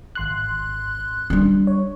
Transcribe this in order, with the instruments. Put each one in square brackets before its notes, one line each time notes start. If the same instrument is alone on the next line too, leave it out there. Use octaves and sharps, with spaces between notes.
[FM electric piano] G#1 C6 F#6
[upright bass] G3 D4
[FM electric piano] C#5